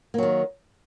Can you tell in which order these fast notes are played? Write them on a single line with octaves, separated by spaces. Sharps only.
A#3 F#3 D#3